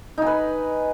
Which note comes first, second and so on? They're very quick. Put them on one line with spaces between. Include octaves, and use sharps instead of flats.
D#4 G#5 B4